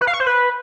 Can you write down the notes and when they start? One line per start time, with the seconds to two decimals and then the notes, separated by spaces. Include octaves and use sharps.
0.01 B4
0.07 F5
0.14 C#6
0.20 C5
0.26 B4